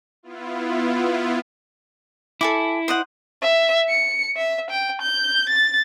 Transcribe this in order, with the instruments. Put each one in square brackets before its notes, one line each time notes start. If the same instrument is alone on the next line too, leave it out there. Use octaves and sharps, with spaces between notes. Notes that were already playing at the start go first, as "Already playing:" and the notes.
[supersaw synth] B3 E4 F4
[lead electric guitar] E4 [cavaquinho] A4 G#5 D6
[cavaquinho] C5 D#5 F#5
[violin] E5
C#7
E5
G5
G6
A6